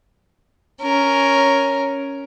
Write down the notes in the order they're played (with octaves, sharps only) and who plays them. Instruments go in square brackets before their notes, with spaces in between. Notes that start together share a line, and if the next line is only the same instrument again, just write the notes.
[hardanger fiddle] C#4 A#4